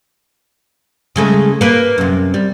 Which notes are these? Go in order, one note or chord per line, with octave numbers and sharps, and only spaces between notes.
C#3 G#3 A3
A#3 B4
F#2 C3
G3